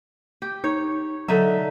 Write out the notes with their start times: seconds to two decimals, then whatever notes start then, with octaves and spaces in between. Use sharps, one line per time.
0.42 G4
0.64 D#4 C#5
1.28 D3 F#3 D#4 E5